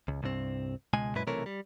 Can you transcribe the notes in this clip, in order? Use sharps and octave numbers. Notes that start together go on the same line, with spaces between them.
C#2
C2 G2 C4
C#2 B2 G#3 G#5
F#2 A#2 G#3 E4 B4 B5
B1 C3 E3 A3 A#4 C#5
G3